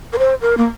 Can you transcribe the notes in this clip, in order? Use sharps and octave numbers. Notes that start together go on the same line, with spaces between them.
A#4
C5
A#4
A#3